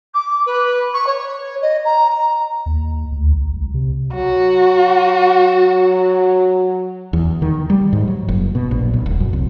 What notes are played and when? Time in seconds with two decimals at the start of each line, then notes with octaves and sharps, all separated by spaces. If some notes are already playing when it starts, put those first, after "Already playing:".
0.14 D6
0.46 B4
0.94 C#6
1.06 C#5
1.62 D#5
1.85 A#5
2.10 A#5
2.66 D#2
3.12 D2
3.32 B1
3.56 C#2
3.74 C3
4.15 F#3 F#4
7.13 E2
7.42 D#3
7.70 G3
7.93 G#2
8.08 F#3
8.28 F#1
8.55 B2
8.71 A#1
8.93 B1
9.06 D#1
9.20 F#2
9.33 C2